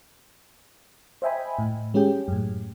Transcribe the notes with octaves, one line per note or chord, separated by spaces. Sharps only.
C5 D#5 E5 G5 G#5 B5
A2
G#3 C#4 G4 G#4 G5
F#2 A2